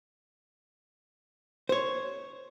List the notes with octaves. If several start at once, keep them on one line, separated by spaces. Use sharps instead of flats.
C5 C#5